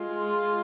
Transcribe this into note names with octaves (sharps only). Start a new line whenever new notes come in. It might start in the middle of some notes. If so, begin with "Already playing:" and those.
Already playing: G#3 F4